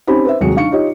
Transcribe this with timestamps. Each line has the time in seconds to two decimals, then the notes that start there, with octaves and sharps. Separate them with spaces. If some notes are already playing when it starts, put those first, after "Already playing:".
0.08 C4 C#4 D#4 G4 C5 B5
0.25 B4 C5 E5
0.40 D#1 C3 F#3 G#3 C#7
0.55 D4 D#4 F5 C#6 C#7
0.71 D#4 F4 G4 C#5 D#5